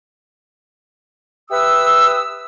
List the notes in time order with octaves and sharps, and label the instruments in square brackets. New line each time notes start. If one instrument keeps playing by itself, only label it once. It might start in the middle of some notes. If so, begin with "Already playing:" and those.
[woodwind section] G4 B4 E5 D#6 E6